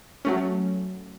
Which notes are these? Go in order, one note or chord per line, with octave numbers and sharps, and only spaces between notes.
F#3 A3 C#4